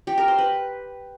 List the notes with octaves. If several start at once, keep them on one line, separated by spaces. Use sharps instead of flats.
G4
A#4
C5
B4